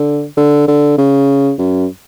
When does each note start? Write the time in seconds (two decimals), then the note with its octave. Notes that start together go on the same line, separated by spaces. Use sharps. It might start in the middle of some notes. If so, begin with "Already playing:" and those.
Already playing: D3
0.37 D3
0.68 D3
0.98 C#3
1.58 F#2